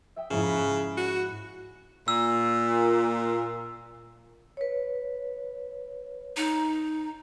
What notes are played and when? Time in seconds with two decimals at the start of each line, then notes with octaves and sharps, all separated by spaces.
0.16 E5 G5 D#6
0.30 F2 G#2 C#3 E4
0.44 B5 F#6
0.97 F#4
2.08 A#2 E6
4.57 B4 C#5
6.37 D#4